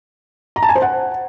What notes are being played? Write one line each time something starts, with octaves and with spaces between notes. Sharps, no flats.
A#5
A5
G#5
C5
F#5